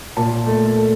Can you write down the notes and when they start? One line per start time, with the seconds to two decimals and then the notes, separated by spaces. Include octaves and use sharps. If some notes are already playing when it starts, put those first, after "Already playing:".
0.17 A#2 A5
0.46 A3
0.77 A3